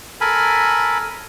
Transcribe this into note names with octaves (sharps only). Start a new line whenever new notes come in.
A4 A#4 G#5 B5